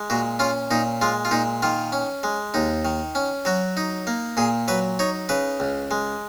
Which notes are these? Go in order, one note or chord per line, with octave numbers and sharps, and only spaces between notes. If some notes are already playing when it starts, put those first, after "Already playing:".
Already playing: G#3
A#2 F#4
C#4 F4
A#2 D#4
G#3 F4
F4
A#2 D#4
D#3 F4
C#4
G#3
D#2 D#4
D#3
C#4
F#3 F#4
D#4
A#3
A#2 G#4
F#3 B4
D#4 C#5
C#3 B4
C#2
G#3